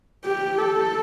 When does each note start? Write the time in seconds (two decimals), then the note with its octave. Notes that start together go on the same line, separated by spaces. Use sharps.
0.25 G4
0.58 A4